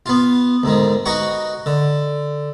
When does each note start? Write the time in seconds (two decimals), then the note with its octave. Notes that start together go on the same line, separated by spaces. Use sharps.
0.06 B3 F4
0.63 D2 G#2 D#3
1.06 D#4 F#4 B4 F#5 C#6
1.66 D3